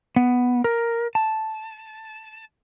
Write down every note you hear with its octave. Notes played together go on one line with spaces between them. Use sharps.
B3
A#4
A5